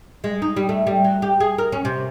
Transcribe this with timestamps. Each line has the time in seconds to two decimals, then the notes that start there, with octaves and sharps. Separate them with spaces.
0.24 G#3
0.42 D#4
0.57 G3
0.69 A3
0.87 G3
1.04 F#3
1.22 G4
1.40 G#4
1.58 A#4
1.72 C#4
1.85 C3